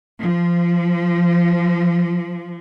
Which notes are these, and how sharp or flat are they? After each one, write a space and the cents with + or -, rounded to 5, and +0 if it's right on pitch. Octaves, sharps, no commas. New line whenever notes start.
F3 -15